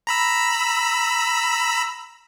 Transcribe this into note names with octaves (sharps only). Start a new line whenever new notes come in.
A#5 B5 E6